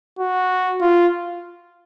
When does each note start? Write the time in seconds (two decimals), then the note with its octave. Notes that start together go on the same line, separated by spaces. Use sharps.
0.19 F#4
0.81 F4